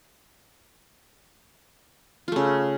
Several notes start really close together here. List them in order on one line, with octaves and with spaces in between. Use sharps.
F4 A3 C#3